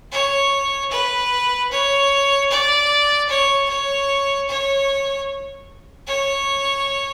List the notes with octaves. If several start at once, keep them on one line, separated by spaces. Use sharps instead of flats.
C#5
B4
C#5
D5
C#5
C#5
C#5
C#5